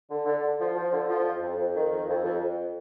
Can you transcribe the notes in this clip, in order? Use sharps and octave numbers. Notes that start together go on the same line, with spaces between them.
D3
D3
D3
F3
F3
D3
F3
F2
F2
F2
D#3
F2
F2
F2
F2